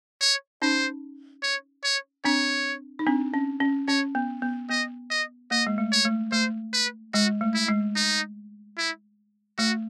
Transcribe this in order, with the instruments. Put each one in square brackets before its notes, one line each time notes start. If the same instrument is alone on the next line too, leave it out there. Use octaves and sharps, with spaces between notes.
[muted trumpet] C#5
[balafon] C#4 D#4 [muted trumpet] C5
[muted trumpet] C#5
C#5
[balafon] C4 D4 [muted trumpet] C#5
[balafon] D#4
C4 D4
C#4
C#4
[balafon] C#4 [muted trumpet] C#5
[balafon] B3
B3
[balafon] B3 [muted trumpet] D#5
[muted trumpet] D#5
[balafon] A#3 [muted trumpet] D#5
[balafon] G#3
A3
[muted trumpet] C#5
[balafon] A3
[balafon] A3 [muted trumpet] C5
[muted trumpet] B4
[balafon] G#3 [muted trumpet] F#4
[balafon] A3
[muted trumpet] E4
[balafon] G#3
[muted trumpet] D#4
E4
[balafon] A3 [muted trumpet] F#4